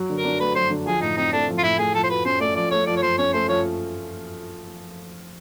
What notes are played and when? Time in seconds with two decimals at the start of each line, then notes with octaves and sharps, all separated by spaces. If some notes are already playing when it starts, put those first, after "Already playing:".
Already playing: F#3
0.10 D3
0.16 A#4
0.25 D4
0.40 A3 B4
0.55 F#3 C5
0.70 D3
0.86 F3 G#4
1.01 A2 D#4
1.17 C4 D#4
1.32 A3 D4
1.48 F3
1.58 F4
1.63 A2 E4
1.79 A3 G#4
1.94 F3 A4
2.03 C5
2.10 F#4 B4
2.25 C#4 C5
2.40 A3 D5
2.56 F3 D5
2.71 A3 C#5
2.87 F3 D5
2.96 C#5
3.02 F3 C5
3.18 C#4 C#5
3.33 A3 C5
3.48 F3 C#5